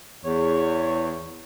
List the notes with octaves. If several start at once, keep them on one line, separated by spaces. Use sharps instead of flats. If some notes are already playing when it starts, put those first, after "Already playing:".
E2 C#5